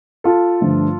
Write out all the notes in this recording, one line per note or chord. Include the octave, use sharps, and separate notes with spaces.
F4 A4
G2 D3 F3 A3